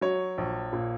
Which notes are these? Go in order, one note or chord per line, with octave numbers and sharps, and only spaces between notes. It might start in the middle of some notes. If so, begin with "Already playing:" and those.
F#3 C#5
A#1
A#2